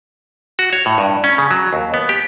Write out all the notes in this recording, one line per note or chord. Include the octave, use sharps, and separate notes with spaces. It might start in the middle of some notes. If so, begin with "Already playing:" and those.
F#4
C#5
A2
G2
C#4
C#3
F#3
D#2
B3
G4